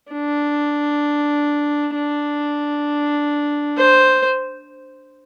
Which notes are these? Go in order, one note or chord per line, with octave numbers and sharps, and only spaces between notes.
D4
D4
C5